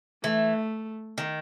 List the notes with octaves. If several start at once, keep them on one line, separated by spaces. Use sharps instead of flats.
E3 A3
D#3